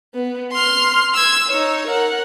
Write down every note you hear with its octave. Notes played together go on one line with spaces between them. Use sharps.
B3
C6 F6
E6 G#6
D#4 C#5
A#4 F#5